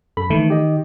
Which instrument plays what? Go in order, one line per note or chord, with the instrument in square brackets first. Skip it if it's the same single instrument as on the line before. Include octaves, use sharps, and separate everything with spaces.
[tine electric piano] F#2 A4 B5
[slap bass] D#3 [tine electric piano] E3 A3
[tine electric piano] G4 D#5